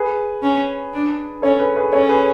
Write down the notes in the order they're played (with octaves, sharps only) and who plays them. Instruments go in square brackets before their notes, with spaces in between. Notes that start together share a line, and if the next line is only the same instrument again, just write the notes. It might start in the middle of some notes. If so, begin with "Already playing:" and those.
Already playing: [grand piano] G#4 B4
[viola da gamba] C#4
D4
[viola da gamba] C#4 [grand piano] A4 C#5
[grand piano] G#4 B4
G#4 B4
[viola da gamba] C#4 [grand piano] A4 C#5
[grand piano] G#4 B4